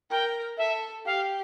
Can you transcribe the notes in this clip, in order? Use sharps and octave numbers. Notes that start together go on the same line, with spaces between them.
A#4 G5
A4 E5
G4 F5